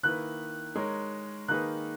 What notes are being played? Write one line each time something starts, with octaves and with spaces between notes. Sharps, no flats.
D#3 A#3 E4 B4 F#6
G#3 D#4 A#4 C#5
D#3 A#3 D#4 G#4 B4 F#6